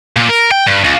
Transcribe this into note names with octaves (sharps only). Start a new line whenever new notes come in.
A#2
A#4
G5
G2
C#2